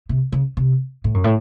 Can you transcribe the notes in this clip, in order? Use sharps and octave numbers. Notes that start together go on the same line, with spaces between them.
C3
C#3
C3
A2
F#2
A2